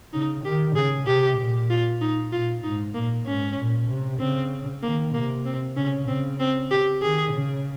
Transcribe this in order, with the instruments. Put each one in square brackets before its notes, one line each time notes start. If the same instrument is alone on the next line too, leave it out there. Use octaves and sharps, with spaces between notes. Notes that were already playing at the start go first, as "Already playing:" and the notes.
[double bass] C#3 [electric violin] D#4
[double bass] D#3 [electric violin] G4
[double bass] C#3 [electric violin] G#4
[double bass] C3 [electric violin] G4
[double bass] A#2
[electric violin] F4
D#4
[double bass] A#2 [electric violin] F4
[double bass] G#2 [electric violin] D#4
[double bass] A#2 [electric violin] A#3
[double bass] G#2 [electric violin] C#4
[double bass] A#2
C3
[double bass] C#3 [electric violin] C4
[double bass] D#3 [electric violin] A#3
[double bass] C3 [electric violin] A#3
[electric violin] C4
[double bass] C#3 [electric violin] C#4
[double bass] C#3 [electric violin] C4
[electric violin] C4
G4
[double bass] D#3 [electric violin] G#4
[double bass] C#3